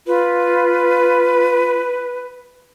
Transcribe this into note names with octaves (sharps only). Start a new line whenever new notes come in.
F4 B4